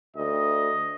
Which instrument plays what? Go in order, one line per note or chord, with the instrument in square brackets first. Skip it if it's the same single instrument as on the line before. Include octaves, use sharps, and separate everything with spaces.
[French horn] D2 [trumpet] D#5